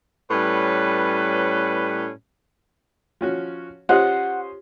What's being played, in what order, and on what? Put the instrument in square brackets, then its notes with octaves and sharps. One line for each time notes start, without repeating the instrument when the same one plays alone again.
[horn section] A2 G3 C#4 B4
[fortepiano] F3 C#4 F#4
[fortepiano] C#4 C5 D#5 [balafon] F4 G4 [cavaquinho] F#5